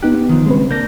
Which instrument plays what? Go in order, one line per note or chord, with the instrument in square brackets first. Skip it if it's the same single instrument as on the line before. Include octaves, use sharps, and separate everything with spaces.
[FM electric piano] B3 D#4 F#6 [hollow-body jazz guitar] G4
[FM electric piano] B3
[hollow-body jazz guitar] D#3 F3
[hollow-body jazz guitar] C#3 G#3 [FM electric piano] G3 C4 B4
[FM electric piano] C4
[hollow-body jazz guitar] A#3 D4 [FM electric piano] G6 A#6